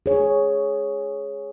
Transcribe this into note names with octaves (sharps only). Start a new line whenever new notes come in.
G#4 C#5